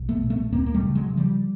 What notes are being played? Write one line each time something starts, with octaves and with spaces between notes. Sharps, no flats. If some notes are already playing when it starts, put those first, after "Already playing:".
Already playing: B1
A3 B3
A#2
A3 B3
D2 A#3 C4
A#3
G3 A3
C#3
F#3 G#3
C#3
F3 G3